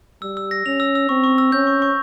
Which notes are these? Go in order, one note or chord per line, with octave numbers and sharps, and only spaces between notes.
G3 E6
E6
A#6
C#4 F7
E6
E6
C4 C#6
C#6
E6
C#4 G6
C#6
C#6